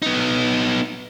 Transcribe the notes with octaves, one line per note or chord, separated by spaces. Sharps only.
B3 D#4